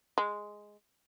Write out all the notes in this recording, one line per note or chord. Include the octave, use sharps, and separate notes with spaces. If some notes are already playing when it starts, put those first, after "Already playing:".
G#3